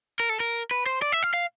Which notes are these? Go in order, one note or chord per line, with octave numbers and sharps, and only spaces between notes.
A#4
A4
A#4
B4
C5
D5
E5
F5
F5